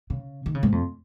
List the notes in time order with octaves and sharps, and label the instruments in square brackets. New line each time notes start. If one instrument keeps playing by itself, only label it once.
[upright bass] C#3
D#3
C#3
G#2
F2